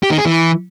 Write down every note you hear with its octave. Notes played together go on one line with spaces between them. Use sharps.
G4
D#3
G#4
E3